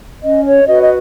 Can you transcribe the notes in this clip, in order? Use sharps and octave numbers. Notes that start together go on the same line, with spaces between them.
C#4 D#5
C#5
F#4 B4 D#5
D#5